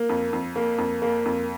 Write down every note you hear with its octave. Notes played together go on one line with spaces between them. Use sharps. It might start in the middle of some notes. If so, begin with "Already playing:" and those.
Already playing: A#3
F2
F2
A#3
F2
A#3
F2